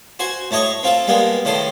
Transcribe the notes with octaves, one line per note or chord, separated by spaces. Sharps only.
F#4 C5 G#5
A2 A3 C#5 D#5 C#6
C4 F4 A4
G3 G#3 A#3 B3
A2 D#3 A4 C6